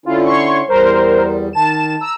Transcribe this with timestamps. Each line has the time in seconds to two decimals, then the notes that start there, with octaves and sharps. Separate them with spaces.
0.06 D3 C#4 E4 F4
0.25 C#5 C6 C#6
0.68 E2 G3 A#4 C5
1.53 D#3 A5 E7
2.01 A#5 E6